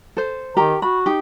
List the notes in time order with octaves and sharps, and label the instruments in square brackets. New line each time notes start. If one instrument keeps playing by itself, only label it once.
[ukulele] A4 C5
[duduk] D#3 [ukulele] G4 A#4 A#5
[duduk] F#4 [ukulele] B5
[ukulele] D#4 G4